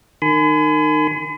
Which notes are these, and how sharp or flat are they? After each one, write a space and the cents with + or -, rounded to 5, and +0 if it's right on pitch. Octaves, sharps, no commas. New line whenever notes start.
D#3 -30 G#5 +25 B5 +45